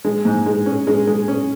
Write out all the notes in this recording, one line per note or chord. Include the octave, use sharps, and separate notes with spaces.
G#3
G#2
G#3
C#4
G#3
G#3
C#4